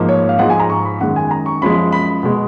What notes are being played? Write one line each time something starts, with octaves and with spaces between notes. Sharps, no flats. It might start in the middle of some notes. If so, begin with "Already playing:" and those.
Already playing: G#2 F3 A#3
C#5
F5
G#2 F3 G#3 F#5
G#5
A#5
C#6
B5
F#2 D#3 G#3 F#5
G#5
A#5
C#6
F#2 F3 G#3 B5
B5
B2 G#3